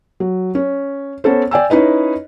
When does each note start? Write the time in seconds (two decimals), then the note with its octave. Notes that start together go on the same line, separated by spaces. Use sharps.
0.20 F#3
0.55 C#4
1.24 B3 C#4 A4 C5
1.51 D5 G5 G#5 E6
1.70 C#4 D#4 E4 B4 D#5